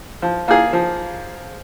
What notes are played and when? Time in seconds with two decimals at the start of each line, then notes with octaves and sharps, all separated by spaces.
0.22 F3
0.48 A#3 F4 G#4
0.73 F3